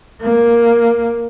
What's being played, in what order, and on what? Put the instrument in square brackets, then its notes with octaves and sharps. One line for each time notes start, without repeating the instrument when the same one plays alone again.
[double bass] A#3